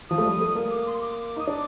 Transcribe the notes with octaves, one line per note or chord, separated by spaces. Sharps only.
F3 D#6
A3
G3
A3
A#3
D6
C6
C6
D6
D#4 D#6
D4 D6